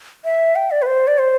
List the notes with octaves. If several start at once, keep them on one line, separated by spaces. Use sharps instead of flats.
E5
G5
D5
B4
C5
D5
C5